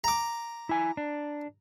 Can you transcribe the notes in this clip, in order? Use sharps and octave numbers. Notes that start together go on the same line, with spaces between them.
A#5 D6
E4 G#5
D4